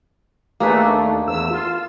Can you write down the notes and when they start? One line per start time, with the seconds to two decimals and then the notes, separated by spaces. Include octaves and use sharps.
0.60 D#2 A3 A#3 D4 G#4 B4
1.27 E2 E6
1.50 F4